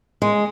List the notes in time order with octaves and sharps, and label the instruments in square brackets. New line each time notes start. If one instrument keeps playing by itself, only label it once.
[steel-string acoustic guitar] G#3